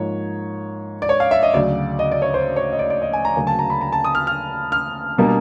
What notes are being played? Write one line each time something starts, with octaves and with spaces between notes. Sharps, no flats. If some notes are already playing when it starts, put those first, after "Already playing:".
Already playing: G#2 F3 A#3 C#5
D5
C#5
F5
E5
D#5
D2 C#3 F#3 D5
D#5
D5
C#5
C5
C#5
D#5
D5
D5
D#5
G#5
A#5
D2 C#3 F#3 A#3 C#4 G#5
A5
A#5
B5
A#5
A5
D#6
F6
F6
F6
B2 G3 A#3 D4